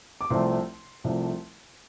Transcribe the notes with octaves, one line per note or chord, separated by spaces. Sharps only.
D6
C2 C3 F3 A3 C4 C6
C2 C3 F3 A3 C4